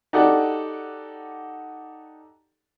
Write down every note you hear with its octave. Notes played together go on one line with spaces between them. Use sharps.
D#4 F#4 G4 A4 D5 F#5